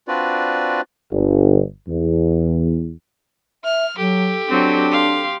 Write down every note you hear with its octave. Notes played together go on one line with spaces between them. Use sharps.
C4 D4 F4 F#4 B4 D5
G1
E2
E5 F6
F#3 G4 A4
F#3 C4 D4
F5 C6